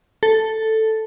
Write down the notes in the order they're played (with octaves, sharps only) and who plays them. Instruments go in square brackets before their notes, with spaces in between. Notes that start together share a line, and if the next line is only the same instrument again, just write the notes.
[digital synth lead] A4